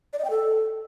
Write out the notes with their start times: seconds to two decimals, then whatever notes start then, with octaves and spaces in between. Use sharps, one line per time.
0.13 D5
0.19 D#5
0.25 G5
0.30 A4